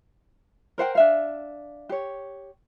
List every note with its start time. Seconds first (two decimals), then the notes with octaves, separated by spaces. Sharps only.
0.78 A#4 C5 F#5 G5
0.95 D4 E5 F5
1.89 G4 C#5